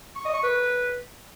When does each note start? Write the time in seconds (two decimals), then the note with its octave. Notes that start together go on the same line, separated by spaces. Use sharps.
0.15 C#6
0.25 D#5
0.34 C#6
0.43 B4